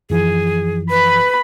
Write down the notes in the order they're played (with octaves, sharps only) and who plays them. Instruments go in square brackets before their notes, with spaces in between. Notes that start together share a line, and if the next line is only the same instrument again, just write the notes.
[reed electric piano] F#2 E3 F3 [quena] G#4
[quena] B4 [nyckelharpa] B5